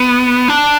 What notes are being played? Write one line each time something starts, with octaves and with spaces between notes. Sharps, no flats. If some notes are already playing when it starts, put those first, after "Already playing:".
Already playing: B3
D4